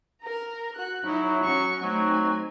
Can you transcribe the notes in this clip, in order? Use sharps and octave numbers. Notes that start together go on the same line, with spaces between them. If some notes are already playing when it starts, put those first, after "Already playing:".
A#4 A#5
F#4 F#6
F#3 D#4 E4 C#5
C#4 F#4 C#6
F#3 A3 C4 D#4 G#5